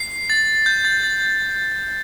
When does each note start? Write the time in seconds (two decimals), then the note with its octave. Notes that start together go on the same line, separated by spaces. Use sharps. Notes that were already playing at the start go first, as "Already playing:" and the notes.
Already playing: C7
0.30 A6
0.66 G6
0.85 A6
1.03 A6